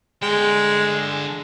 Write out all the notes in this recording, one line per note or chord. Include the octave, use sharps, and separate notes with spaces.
D3 G#3 G5